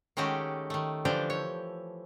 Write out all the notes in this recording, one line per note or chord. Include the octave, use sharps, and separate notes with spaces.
D#3 G#3 A3 C#4 F#4 G4
D#3 A3
D3 E3 F3 D4 G4
C#5